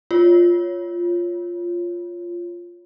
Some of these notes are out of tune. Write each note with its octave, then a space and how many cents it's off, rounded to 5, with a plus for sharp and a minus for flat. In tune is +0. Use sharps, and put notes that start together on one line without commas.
F4 +0 C#5 +0